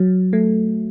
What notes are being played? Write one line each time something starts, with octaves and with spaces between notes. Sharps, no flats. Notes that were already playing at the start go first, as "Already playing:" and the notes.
Already playing: F#3
A3